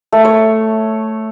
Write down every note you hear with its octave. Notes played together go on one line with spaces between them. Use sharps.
A3
C#5